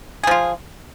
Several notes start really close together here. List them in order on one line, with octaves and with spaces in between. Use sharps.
G#4 F3 F4